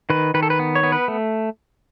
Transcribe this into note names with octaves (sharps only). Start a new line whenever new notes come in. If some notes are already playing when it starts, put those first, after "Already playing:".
D#3 B4
D#3 B4
A4
B4
B3
C#5
B3
B4
A3